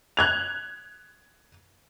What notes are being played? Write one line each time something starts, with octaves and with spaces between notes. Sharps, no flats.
F#6 G#6 F7